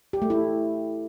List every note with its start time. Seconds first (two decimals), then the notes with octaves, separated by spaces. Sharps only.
0.13 G4
0.22 A3
0.30 E4